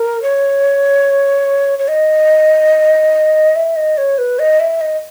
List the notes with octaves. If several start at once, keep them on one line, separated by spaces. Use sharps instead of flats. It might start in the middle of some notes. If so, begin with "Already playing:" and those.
Already playing: A#4
C#5
C#5
D#5
E5
D#5
C#5
B4
D#5
E5
D#5